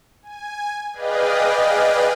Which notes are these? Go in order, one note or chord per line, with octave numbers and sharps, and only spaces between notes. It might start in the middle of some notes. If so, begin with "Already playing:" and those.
G#5
G#4 B4 D5 D#5 F5 G5